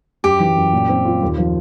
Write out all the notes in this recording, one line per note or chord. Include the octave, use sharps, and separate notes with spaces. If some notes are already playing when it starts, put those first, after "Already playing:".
F#2 G4
E3
F#2
A#2
C4
F4
D#2
F3